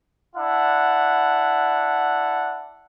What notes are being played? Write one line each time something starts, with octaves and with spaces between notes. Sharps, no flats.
D4 E4 F#5